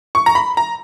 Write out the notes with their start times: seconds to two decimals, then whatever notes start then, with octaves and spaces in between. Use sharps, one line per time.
0.15 C#6
0.26 A#5
0.35 B5
0.57 A#5